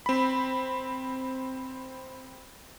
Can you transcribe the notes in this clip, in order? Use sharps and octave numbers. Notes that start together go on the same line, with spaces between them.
C4 B5